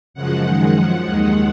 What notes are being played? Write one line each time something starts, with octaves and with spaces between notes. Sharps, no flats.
F#2 C#3 F3 G#3 F#5
F#2 D#3 G#3
F#2 F3 G#3
D#2 D#3 G#3